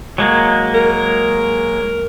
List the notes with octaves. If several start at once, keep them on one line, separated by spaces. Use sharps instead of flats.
F#3 G#3 A#3
A#4